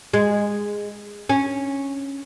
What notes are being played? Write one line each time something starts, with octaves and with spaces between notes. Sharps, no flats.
G#3
C#4